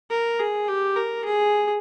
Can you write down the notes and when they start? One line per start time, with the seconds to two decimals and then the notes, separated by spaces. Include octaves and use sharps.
0.10 A#4
0.40 G#4
0.68 G4
0.96 A#4
1.25 G#4